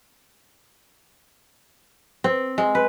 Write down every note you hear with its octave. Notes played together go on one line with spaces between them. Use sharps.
C4
G#3
B4